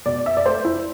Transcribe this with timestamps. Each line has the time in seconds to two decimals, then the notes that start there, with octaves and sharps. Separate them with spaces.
0.06 B2 D5
0.26 E5
0.37 D5
0.45 A3 C5
0.65 E4